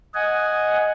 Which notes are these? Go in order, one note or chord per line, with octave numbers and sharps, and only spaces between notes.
D#5 F#5 G#5